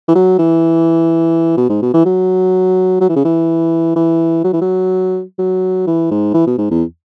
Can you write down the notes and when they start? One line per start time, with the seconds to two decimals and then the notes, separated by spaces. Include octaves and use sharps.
0.08 E3
0.15 F#3
0.39 E3
1.57 B2
1.70 G#2
1.82 B2
1.94 E3
2.05 F#3
3.01 F#3
3.09 E3
3.16 C#3
3.25 E3
3.96 E3
4.44 F#3
4.53 E3
4.61 F#3
5.39 F#3
5.87 E3
6.11 G#2
6.34 E3
6.47 B2
6.58 G#2
6.71 E2